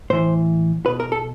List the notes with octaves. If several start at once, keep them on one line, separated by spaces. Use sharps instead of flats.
A2 E3 C5
B2 B4
A#4
A4